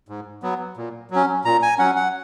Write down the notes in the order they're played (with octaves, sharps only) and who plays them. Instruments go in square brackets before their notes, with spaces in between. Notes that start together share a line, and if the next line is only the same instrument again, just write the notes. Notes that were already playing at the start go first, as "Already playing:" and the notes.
[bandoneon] G#2
F#3 B3
A#2
F#3
C#4
A#2 A#5
G#5
F#3 C#4 F#5
F#5